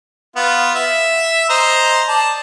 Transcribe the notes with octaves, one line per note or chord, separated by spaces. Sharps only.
B3 F4
E5
C5 D#5 A#5
D5 A5